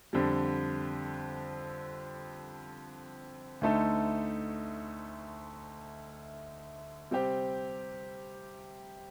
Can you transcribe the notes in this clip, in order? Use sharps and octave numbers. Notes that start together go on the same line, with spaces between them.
F2 D3 G3
D2 D3 A3 D#4 A4
C3 G3 C4 G4